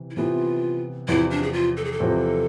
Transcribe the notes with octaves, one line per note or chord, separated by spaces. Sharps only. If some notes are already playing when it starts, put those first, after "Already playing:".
Already playing: C3 E3
E4
C3 E3 B3 F4
E2 C3 F3 E4
D4
G#4
F4
A4
G#4
A4
E2 C3 F3